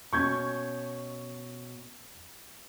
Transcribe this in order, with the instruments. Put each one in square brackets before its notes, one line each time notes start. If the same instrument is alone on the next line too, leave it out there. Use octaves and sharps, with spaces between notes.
[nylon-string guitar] B2 C#4 [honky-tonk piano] C#6 G6 G#6